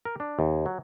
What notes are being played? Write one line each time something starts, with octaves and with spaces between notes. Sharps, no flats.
A#4
D4
D#2
F#3